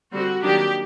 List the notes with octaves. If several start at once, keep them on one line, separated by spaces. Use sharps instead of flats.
D3 G3 C4 F#4
D#3 F#3 A#3 D4 G4